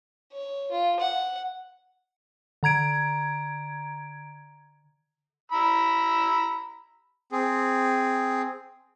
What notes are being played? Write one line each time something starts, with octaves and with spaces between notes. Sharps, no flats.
C#5
F4
F#5
D3 A#5 G#6 D7
A#5 B5 E6
C4 G#4